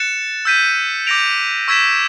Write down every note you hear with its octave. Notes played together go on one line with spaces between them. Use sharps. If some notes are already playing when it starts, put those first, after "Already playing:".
Already playing: F#6 A6 C#7 E7
E6 G6 B6 D#7
D6 G6 A#6 D7 F7
C#6 E6 G#6 B6 E7